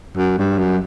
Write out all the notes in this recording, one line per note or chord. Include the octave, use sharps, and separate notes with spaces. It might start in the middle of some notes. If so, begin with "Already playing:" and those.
F#2
G2
F#2